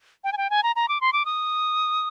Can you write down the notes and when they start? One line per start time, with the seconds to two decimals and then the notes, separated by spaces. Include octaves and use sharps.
0.24 G5
0.32 G#5
0.37 G5
0.50 G#5
0.63 A#5
0.76 A#5
0.88 D6
1.01 C6
1.13 D6
1.25 D#6